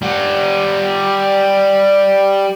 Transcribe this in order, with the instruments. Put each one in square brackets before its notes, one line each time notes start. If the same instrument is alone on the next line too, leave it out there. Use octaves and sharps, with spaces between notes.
[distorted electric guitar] G3 F#5